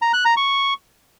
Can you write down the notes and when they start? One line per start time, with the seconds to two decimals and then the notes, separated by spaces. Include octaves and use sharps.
0.02 A#5
0.13 F#6
0.25 A#5
0.37 C#6